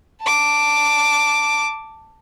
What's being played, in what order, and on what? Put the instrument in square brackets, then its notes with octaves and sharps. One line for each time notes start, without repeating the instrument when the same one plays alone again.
[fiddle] A5 D6